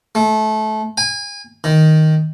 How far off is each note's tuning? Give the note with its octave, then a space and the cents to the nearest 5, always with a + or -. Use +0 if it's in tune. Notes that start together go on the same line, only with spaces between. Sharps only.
A3 -25
G#5 -30
D#3 +5